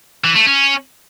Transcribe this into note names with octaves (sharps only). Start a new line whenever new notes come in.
E3
A3
C#4